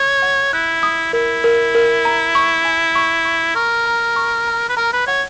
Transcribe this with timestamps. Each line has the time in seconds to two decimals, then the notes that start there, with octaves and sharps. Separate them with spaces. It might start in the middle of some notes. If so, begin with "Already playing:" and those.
Already playing: C#5 D#6
0.22 F#5
0.53 E4 F#6
0.83 D#6
1.13 E4 A#4
1.44 A#4
1.75 A#4
2.05 A#5
2.35 C#6
2.65 G#5
2.95 C#6
3.25 C#6
3.55 A#4 C#6
3.86 A#5
4.16 C#6
4.47 A#5
4.69 B4
4.77 A#4 A#5
4.93 B4
5.07 C#5 F#5